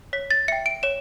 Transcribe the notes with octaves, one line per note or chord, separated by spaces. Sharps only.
C#5 B6
A6
E5 G5 C#7
D7
C#5 E7